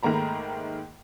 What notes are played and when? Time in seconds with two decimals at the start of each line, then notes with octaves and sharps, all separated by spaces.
0.03 G#2 D#3 A3 A#3 A#5 B5